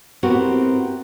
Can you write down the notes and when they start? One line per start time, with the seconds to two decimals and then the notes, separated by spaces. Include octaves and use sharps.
0.23 B3 C4 E4 F#4 G4 A#4